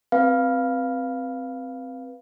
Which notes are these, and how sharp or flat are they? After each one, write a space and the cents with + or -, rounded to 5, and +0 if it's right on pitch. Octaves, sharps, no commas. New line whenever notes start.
C4 +0 B4 -15 F5 +0